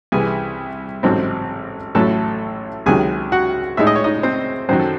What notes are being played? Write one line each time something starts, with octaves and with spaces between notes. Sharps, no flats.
C2 C3 E3 G#4 G#5
A1 G#2 F#3 C4 D#4
A1 A2 F#3 A3 A4 A5
C#2 C3 D#3 F#3 G#4 G#5
F#4 F#5
A2 G#3 D#4 E5
D#5
C#5
D#4 D#5
C4 C5
F#2 D#3 F#3 C5
A4